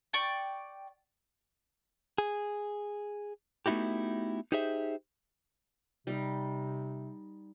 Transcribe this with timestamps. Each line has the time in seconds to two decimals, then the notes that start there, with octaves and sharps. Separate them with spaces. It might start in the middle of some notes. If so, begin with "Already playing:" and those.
0.13 D5 G5 C#6
2.18 G#4
3.66 A3 B3 D#4 E4 F#4 G4
4.52 D#4 G4 G#4 C5 E5
6.07 C3 G3 D#4